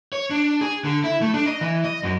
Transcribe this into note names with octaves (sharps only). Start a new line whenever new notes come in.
C#5
D4
G#4
D3
E4
A3
D4
D#5
E3
D#5
F#2